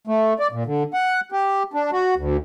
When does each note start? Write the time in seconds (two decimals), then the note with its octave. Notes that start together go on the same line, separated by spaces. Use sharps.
0.07 A3
0.39 D5
0.52 A#2
0.66 D3
0.94 F#5
1.32 G4
1.74 D4
1.93 F#4
2.17 D2